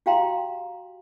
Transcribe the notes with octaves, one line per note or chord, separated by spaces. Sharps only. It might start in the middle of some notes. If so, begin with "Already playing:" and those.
F#4 G4 F5 G5 A#5 C6